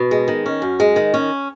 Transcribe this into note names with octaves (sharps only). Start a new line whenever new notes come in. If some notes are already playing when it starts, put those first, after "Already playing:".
Already playing: B2
G#3
D#3
C#4
F#2
G#3
D#3
C#4